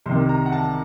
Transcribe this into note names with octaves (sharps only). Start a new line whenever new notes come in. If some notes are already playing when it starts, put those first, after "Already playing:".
C2 C3 D#3 C6
A#5
F#5
A5